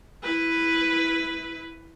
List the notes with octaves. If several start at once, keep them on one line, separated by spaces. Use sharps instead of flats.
E4 B4